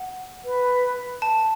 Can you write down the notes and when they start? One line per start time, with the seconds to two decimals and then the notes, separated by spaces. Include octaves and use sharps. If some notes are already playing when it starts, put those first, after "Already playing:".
Already playing: F#5
0.44 B4
1.22 A5